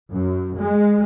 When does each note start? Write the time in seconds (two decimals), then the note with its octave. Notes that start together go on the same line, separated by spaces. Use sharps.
0.11 F#2
0.58 G#3